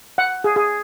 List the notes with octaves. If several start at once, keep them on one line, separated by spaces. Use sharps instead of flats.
F#5
G#4
G#4